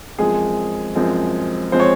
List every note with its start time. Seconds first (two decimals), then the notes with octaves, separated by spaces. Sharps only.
0.18 F#2 F3 G#3 C4 G#4
0.95 F#2 F3 G#3 C4
1.72 F3 G#3 C4 C5
1.80 C#5